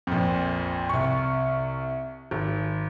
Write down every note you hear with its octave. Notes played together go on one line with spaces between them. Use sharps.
A#1 F2
C2 C#6
G#1